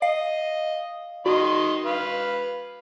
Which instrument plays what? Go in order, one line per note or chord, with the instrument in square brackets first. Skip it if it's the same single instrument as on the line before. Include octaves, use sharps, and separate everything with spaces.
[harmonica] D#5 [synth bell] F5
[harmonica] D#3 D#5 C6 [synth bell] F#4
[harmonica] B4 F5